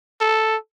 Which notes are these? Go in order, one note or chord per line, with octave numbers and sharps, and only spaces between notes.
A4